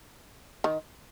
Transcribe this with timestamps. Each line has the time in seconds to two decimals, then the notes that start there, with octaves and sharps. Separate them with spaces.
0.64 D#3